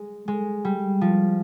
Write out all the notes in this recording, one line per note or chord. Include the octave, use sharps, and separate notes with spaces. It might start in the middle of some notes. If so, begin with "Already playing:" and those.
Already playing: G#3
G#3
G3
F3